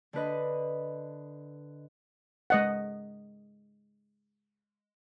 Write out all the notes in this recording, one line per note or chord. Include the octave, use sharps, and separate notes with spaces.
D3 D4 B4 D#5
G#3 D#5 F#5